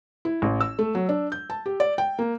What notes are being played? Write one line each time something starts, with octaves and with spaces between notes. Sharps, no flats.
E4
A1
E6
A3
F#3
D4
G6
A5
G4
D5
G5
A#3